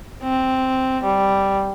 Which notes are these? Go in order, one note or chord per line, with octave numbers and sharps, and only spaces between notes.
C4
G3